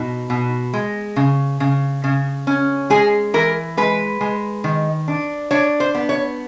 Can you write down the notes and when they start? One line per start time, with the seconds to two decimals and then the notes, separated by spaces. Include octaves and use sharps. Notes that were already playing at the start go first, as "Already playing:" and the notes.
Already playing: B2 D#4
0.30 B2
0.73 G#3
1.16 C#3
1.60 C#3
2.04 C#3
2.47 C#4
2.90 G#3 G#4
3.34 E3 A#4
3.77 G#3 B4
4.21 G#3
4.64 D#3
5.08 D4
5.51 D4 C#5
5.80 C5
5.95 B3
6.09 C#5